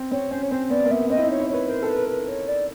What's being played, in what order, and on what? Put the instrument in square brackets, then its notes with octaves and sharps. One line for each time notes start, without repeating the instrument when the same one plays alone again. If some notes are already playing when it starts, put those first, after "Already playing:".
Already playing: [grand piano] C4
[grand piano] C4 [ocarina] C#5
[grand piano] C#4 [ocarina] C5
[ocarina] C#5
[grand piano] C4 [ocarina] C5
[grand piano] B3 [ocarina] D5
[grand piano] A#3
[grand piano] B3 [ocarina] E5
[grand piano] C4 [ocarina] D#5
[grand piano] E4
D#4
[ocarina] C#5
[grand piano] E4
[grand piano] B4 [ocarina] C#5
[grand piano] A#4 [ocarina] C5
[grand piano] A4
[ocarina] B4
[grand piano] A#4
[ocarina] B4
C#5
D5